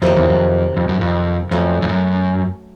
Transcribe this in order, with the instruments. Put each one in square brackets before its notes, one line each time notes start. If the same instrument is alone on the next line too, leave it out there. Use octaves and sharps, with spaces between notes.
[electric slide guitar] F2 [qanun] C3 D#3 F#3 A#3
[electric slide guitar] E2
F2
F2
F#2
F2
[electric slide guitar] F2 [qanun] F#3 A3 C#4
[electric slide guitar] F2
F#2